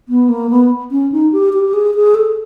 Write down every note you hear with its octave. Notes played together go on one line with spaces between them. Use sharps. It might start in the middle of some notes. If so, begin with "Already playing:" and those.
B3
A#3
B3
C#4
D#4
G4
G4
G#4
G#4
A4